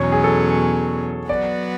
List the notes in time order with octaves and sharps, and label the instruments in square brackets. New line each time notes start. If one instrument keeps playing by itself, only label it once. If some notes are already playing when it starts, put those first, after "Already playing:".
Already playing: [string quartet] E2 B2 F#3 C#4 [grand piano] C#5
[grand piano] G#4
A4
[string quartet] F#3 B3 F#4 B4 [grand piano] D5